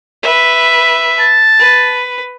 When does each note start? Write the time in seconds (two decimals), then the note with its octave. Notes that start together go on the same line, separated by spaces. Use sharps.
0.23 B4 E5
1.20 A5
1.59 B4